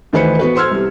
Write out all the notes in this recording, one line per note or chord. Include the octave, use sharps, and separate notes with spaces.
D2 D#3 E3 B4 C5 C#7
B3 F#4 B4
C5 C6 E6 F6 G#6
C2 C3